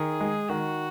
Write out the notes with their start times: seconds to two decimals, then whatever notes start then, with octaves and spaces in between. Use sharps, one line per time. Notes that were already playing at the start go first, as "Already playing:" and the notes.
Already playing: D#3 G#4
0.21 G#3
0.49 D#3 F#4